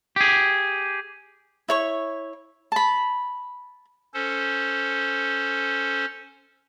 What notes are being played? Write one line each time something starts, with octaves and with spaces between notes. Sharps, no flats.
G4 G#4
E4 C#5 C#6
A5 B5
C#4 A4 C5